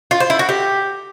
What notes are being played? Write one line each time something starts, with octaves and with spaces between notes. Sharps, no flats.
F4
C5
E4
F#4
G4